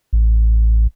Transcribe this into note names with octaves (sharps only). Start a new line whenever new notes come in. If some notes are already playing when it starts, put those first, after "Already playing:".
A1